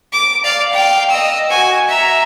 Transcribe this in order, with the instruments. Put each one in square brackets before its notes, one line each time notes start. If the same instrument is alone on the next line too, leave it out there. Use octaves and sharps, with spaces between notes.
[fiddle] D6
D5 F5
F5 G5
D#5 E6
F#4 G#5
E5 A#5